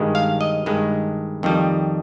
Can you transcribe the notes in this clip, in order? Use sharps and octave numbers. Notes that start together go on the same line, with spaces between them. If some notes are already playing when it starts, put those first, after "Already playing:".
Already playing: G2 D#3 G#3
F5
D#5
G2 D#3 G#3
F2 D#3 G3